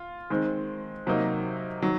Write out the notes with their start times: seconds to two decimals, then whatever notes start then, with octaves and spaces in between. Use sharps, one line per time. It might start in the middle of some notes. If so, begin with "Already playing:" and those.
Already playing: F4
0.30 D#3 G#3 C4
1.07 C3 F#3 A#3 D#4
1.82 D#3 F#3